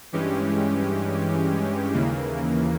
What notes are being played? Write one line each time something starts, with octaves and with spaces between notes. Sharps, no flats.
G2 E3 G#3 C#4 G4
D#2 C#3 E3 A#3